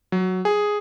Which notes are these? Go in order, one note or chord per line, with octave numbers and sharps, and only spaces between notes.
F#3
G#4